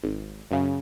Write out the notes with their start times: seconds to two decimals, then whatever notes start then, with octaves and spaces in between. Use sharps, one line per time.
0.03 G#1
0.51 F#2 C#3